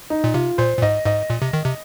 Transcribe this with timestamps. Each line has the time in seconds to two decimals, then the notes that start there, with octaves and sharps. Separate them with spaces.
0.10 D#4
0.24 A#2
0.34 C3 F4
0.58 A#2 C5
0.77 A#2
0.82 G#2 D#5
1.06 G#2 D#5
1.30 A#2
1.42 C3
1.53 D#3
1.65 C3